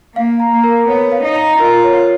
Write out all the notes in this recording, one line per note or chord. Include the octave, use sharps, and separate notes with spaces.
A#3 F5
A#5
A#3
A#4
B3 C#5
F5
D#4
A#5
F4 A#4
C#5